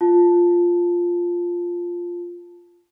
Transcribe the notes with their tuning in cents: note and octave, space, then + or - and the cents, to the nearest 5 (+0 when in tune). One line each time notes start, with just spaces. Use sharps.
F4 +0 A5 +0